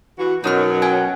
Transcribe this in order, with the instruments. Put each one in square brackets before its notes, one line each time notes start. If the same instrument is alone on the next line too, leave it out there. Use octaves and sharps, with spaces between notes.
[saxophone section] E3 F#4
[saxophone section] F#2 B2 F#3 [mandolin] D#4 D#6 F6
[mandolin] C#4 F#5 G5